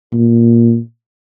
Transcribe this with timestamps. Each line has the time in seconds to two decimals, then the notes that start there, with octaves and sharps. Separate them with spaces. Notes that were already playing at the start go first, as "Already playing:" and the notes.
0.13 A#2